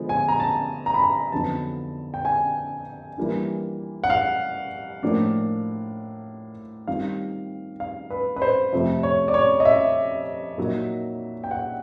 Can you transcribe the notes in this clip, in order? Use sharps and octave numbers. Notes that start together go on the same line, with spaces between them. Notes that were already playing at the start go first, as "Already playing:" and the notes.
Already playing: D3 F3 G#3 B3
G#5
A#5
A5
A#5
B5
A#5
F2 D3 F#3 B3 D#4 A5
G5
G#5
E3 G3 A#3 D4 F4
F#5
F5
A2 F3 A#3 D4
D#3 G3 C4 F4 F5
F5
B4
B4
C5
F2 C3 F3 A3
C#5
D5
C#5
D#5
E5
A#2 F#3 A#3 D#4
G5
F#5